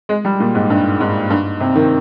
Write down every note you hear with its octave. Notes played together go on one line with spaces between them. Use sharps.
G#3
G3
A#2
G#2
G2
G#2
G2
C3
D#3